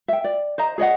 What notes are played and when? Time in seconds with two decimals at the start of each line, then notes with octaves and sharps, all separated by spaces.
0.08 E5 G5
0.24 D5
0.58 C5 D#5 A#5
0.78 G#4 C#5 D#5 F#5